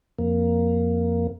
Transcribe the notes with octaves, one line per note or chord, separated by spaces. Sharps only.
F2 A#3